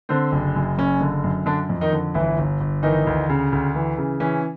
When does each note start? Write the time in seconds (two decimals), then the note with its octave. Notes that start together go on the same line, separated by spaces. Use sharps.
0.09 D3 C4
0.32 F#1
0.56 F#2
0.77 F#1 C#4
1.00 D3
1.24 F#2
1.46 D3 D4
1.69 F2
1.81 D#3 D#4
1.93 D3
2.14 G1 E3 E4
2.38 G1
2.60 G1
2.83 D#3 E3 D#4
3.07 D2
3.29 C#3
3.52 D2
3.75 E3
3.98 C#3
4.20 E3 C#4